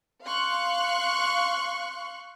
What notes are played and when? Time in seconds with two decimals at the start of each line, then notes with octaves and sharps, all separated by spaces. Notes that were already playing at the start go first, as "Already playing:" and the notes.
0.25 F5 C6 C#6 F#6